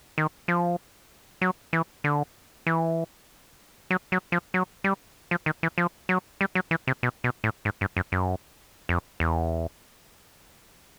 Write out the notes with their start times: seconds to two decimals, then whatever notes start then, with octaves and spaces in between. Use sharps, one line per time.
0.18 D#3
0.48 F3
1.41 F#3
1.73 E3
2.04 D3
2.67 E3
3.91 F#3
4.12 F#3
4.32 F3
4.54 F#3
4.84 G3
5.31 F3
5.46 D#3
5.63 E3
5.78 F3
6.09 F#3
6.41 G3
6.55 F#3
6.71 E3
6.87 C3
7.03 B2
7.24 B2
7.44 A2
7.65 G#2
7.81 G2
7.97 F#2
8.12 F#2
8.89 F2
9.20 E2